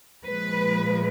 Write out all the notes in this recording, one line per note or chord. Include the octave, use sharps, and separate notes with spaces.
A#2 F3 G#3 B4